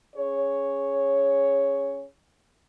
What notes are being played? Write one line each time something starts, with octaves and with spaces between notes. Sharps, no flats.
C#4 G#4 C#5